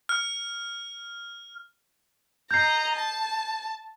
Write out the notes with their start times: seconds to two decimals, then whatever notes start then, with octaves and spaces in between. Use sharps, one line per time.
0.09 F6
2.51 D#5 A#5 G6 C7
2.95 A5